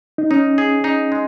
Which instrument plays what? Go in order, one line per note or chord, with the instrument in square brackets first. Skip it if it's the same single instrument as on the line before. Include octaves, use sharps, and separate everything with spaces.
[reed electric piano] D#4
[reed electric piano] C#4 [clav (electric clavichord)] D#4
[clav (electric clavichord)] G#4
D#4
G#3